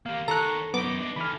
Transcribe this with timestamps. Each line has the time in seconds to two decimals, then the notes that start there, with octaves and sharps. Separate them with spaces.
0.06 A#3 G4 F5
0.28 D#3 A4 C#5 A#5 F#6
0.74 F#2 B3 D#4 D6
1.01 D4 D#5
1.16 D3 E3 B5 F6